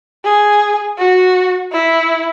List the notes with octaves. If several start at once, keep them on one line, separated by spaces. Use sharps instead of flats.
G#4
F#4
E4